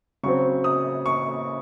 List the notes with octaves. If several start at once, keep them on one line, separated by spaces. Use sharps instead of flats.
C#3 F#3 C4 C#6
D#6
C#6